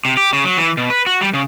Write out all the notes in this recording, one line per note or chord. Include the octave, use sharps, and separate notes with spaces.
C3
G4
C#3
F#3
E3
B2
B4
F#4
G3
C#3